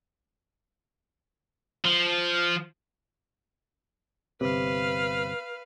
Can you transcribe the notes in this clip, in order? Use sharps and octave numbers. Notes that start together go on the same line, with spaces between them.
F3
G1 C3 B4 F5